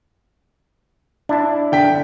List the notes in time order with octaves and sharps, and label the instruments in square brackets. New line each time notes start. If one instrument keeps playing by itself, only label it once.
[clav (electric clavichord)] D4 E4 A5
[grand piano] D3 G5 B6